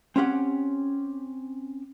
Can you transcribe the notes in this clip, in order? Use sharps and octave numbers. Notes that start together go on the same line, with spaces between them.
C4 C#4 G4 F#5